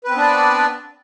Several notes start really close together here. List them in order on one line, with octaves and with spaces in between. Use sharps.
B4 C4 B3 D4 D5